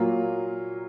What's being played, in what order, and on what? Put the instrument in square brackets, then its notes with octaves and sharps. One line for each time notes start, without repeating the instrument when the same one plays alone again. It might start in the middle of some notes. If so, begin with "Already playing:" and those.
Already playing: [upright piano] A#2 F#3 A#3 F4